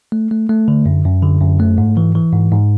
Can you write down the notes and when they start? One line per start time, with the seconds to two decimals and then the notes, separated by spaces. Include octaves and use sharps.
0.12 A3
0.31 A3
0.49 A3
0.68 D3
0.86 F#2
1.05 F#2
1.23 D3
1.41 F#2
1.60 A3
1.78 G#2
1.97 E3
2.15 E3
2.33 G#2
2.52 G#2